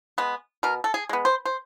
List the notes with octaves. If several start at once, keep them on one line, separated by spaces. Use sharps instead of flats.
G#3 B3
B2 A#4
A4
G#4
G#3 B3
C5
C5